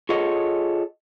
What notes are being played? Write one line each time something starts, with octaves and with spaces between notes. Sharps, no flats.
F4 G#4 A4 C#5 D#5 F#5